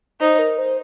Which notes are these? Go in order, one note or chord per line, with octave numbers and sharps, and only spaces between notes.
D#4 C5
A#4
C5